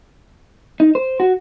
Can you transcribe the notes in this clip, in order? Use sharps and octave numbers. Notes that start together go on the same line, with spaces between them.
D#4
C5
F#4